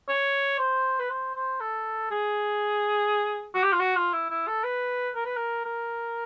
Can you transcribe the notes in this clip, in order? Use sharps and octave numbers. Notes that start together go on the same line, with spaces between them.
C#5
C5
B4
C5
C5
A4
G#4
F#4
G4
F4
F#4
F4
E4
E4
A4
B4
A#4
B4
A#4
A#4